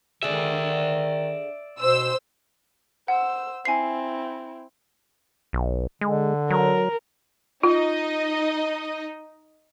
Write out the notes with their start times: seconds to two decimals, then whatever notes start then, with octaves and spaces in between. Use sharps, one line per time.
0.23 D3 D#3 G#4 D5 E5
1.79 B2 C5 E6
3.08 C5 F#5 E6
3.65 C4 E4 G#5 C7
5.53 B1
6.01 D3 G#3
6.50 F#3 A#4
7.63 D#4 F4 D#5